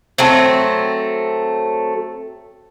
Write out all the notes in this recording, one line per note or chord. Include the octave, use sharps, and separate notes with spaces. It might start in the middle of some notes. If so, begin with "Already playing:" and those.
F#3 A3 C4